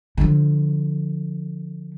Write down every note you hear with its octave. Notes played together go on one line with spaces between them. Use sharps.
D3 F3